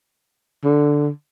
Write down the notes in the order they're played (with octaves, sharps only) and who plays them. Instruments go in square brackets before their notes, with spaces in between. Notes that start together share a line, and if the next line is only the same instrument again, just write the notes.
[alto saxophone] D3